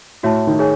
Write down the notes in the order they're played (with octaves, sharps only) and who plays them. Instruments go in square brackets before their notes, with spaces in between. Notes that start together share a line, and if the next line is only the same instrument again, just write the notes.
[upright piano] A2 [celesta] F#4 C#5 E5 A5
[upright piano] D#3
[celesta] G#4 C#5 G#5